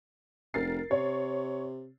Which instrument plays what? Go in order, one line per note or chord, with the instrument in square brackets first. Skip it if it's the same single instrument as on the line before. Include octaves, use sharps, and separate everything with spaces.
[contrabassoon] F1 [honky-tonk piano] A#4 A6 C7
[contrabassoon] C3 [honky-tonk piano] C#5